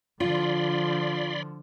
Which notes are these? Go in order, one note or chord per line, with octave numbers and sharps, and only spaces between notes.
D3 F3 F4 D5 B5 C6